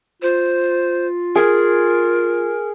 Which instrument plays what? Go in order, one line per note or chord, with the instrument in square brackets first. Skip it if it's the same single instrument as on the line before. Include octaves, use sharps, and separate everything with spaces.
[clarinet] F4 [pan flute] C5
[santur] G#4 [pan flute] A#4